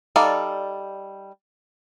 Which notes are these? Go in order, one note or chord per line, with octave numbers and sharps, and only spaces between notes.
G3 D#4 A4 D5 F5